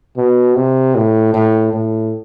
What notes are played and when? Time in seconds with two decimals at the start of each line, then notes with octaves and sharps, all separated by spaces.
0.17 B2
0.56 C3
0.96 A2
1.34 A2
1.73 A2